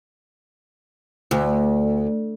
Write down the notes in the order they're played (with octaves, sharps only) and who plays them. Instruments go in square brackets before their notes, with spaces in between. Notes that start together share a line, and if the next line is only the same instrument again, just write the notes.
[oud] D2